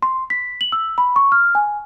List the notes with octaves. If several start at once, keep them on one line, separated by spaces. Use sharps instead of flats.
C6
B6
F#7
E6
B5
C#6
F6
G#5